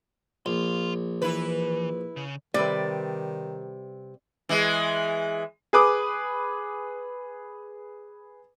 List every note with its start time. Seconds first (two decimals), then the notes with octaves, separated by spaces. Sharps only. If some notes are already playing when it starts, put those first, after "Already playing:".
0.46 A#1 F5 C6
1.22 E3 E4 B4
2.16 C#3
2.54 C3 D#3 G3 B4 D5
4.49 E3 G#3
5.73 G#4 B4 D6 D#6